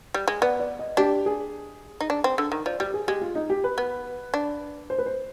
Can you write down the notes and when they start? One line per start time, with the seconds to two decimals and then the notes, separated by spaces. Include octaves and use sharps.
0.14 G3
0.28 G#3
0.42 B3 D5
0.60 D5
0.79 D#5
0.97 D4 G4
1.26 G#4
2.01 D#4
2.10 D4
2.24 C4
2.38 D3
2.52 D#3
2.66 F3 D5
2.80 G3 G4
2.94 G#4
3.08 G#3 G4
3.22 F4
3.35 D#4
3.50 G4
3.64 B4
3.78 B3
4.34 D4
4.90 C5
4.99 B4
5.06 C5